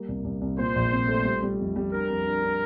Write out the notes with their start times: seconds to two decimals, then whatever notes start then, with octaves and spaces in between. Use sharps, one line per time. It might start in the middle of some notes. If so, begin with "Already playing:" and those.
Already playing: G3 A#3
0.08 C2
0.24 C2
0.41 C2
0.58 A#2 C5
0.76 A#1
0.92 C4
1.08 A3
1.25 G3
1.43 G3
1.60 F2
1.76 G3
1.93 D4 A#4
2.10 F2
2.26 D4
2.44 D4